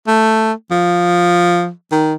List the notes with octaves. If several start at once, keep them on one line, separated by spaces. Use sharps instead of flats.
A3
F3
D#3